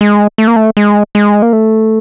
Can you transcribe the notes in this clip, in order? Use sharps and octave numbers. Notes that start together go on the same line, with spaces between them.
G#3
A3
A#3
A3
G#3
G#3
A#3
A3